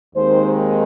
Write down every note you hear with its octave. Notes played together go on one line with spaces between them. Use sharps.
D#2 D#3 G#3 C4 C5